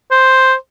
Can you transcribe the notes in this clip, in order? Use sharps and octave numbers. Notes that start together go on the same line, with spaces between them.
C5